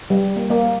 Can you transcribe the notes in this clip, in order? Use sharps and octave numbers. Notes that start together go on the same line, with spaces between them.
G3
A#3
A#3